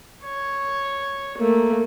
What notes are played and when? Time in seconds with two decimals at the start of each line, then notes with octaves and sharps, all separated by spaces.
0.24 C#5
1.38 A3 A#3